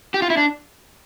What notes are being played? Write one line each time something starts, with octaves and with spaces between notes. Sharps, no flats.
G4
F4
E4
D4